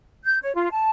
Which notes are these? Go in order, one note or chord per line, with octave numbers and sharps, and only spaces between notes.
G6
C#5
F4
A5